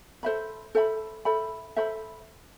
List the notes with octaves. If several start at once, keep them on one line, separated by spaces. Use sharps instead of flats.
A4 C5 E5 B5
A4 C5 E5 B5
A4 C5 E5 B5
A4 C5 E5 B5